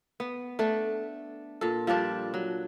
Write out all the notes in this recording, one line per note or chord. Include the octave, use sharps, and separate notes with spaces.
B3
A3 D4 A4 D5
A#2 A4
F3 G3 D4 D5
F#3